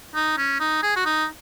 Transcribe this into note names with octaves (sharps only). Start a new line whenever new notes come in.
D#4
C#4
D#4
G#4
F#4
D#4